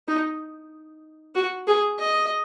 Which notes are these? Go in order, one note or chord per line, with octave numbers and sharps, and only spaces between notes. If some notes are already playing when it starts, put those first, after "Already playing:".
D#4
F#4
G#4
D#5